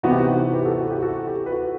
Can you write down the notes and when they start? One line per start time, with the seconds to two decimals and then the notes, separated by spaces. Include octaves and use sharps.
0.03 C3 E3 B3 D#4 F#4
0.11 G4
0.18 F#4
0.29 G4
0.53 G4 B4
0.65 F#4 A4
0.78 F#4
0.90 G4
1.02 F#4 A4
1.27 G4
1.46 B4
1.52 F#4 A4